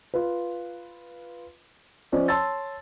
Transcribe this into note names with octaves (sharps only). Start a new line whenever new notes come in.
F4 B4
F3 C#4 C5 D5 D#5
C#5 A5 C6 E6 A6